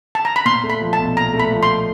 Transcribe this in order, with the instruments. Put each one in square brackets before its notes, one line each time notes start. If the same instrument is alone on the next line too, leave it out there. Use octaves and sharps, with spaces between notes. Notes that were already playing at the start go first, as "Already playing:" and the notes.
[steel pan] A5
A#5
B5
[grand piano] A#2 [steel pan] C6
[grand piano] A3
[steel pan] B5
[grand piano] F3
[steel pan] A5
[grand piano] B1
[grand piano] A#2 [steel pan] A#5
[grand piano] A3
[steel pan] B5
[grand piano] F3
[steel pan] C6